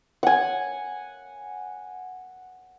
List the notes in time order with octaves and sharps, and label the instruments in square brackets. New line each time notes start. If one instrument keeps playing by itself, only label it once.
[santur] F#5 G#5